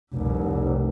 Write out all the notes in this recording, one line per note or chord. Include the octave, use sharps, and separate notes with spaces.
F1 C2